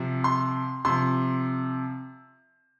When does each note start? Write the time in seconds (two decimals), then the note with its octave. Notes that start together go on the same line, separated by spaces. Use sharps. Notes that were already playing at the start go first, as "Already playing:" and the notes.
Already playing: C3 F3
0.24 C6
0.85 C3 F3 C6